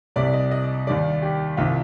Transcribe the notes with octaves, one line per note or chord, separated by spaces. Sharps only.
C2 C3 G3 D5
D#5
D#5
D#2 D#3 G3 D5
G4
C2 C3 D#3 F4